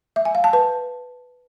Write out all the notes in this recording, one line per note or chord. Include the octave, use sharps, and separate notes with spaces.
E5
G#5
F5
A5
B4